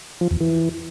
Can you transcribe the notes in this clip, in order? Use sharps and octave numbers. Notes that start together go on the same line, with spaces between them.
F3
E2
E3